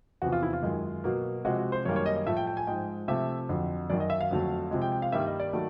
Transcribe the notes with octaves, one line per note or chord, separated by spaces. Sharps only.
E2 C3 F3 F#4
F4
E4
F4
F#2 D#3 G#3
B2 F#3 A#3
C3 F3 G#3 F#4
F#4
C5
F#2 D#3 G3 A#3 C#5
C#5
D#5
D#5
A2 F3 A3 E5
G5
G5
G#5
G#2 F3 G#3 G5
C3 F3 A3 E5
F2 D3 F#3
F#2 D#3 F#3 D5
D#5
E5
F5
F2 D3 F#3 A3
C3 F3 G#3
G5
G5
F5
G2 D#3 G3 A#3 E5
D#5
D5
D#3 F#3 A3